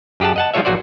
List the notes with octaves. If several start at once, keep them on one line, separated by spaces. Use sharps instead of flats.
F#2 G4 G#4 F#5 A5
D#5 F#5 A5
F3 G3 G#3 F4 C#5 E5
A#1 F#3 F#4 C5 D5